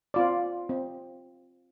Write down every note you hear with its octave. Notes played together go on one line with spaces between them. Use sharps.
C4 F4 D5
C4